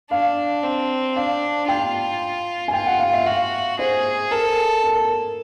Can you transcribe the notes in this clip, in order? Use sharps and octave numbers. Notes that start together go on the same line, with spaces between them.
D4 F5
C4
D4 F5
F4 G5
G#5
F4 G5
F#5
F5
E5
F#4 F5
G#4 C5
A4 A#4
A#4